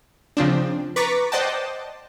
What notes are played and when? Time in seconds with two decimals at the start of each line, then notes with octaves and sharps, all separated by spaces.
0.37 C#3 F3 C4 D4
0.96 B4 A#5 C#6 D6 A6 B6
1.32 C5 D5 D#5 F#5 G5 A5